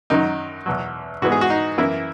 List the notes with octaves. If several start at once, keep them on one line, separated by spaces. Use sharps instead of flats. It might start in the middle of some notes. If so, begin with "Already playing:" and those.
F#2 D#3 F#3 D#4
E2 B2 F#3
G#2 E3 G#3 B3 F#4
G#4
F#4
D#4
F#2 E3 A#3 E4